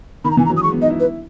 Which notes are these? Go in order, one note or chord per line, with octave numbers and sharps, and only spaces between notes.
D#3 B5
A#5
E3 G#5
A#5
F#3
D#6
G#3 C#6
B3
D#4 D#5
E4
B4